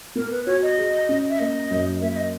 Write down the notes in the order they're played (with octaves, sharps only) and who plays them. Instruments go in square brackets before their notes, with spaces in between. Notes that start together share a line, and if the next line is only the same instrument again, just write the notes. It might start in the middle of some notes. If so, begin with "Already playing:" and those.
[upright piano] B3 [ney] A#4
[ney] B4
[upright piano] F#4 [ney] C#5
[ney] D#5
[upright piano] G#4
C#4
[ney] E5
[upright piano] A#3 [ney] D#5
[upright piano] F#2
[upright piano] A#3 [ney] E5
[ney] E5
D#5